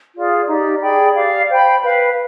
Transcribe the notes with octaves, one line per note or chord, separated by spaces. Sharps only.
F4 G#4 D5
D#4 G4 D5
G#4 D5 G5 B5
G4 D5 F5
C5 G5 B5
B4 F5 B5